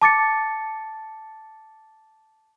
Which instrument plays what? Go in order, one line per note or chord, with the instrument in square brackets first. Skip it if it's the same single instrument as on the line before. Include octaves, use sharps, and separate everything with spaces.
[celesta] A5 D6 A6 C#7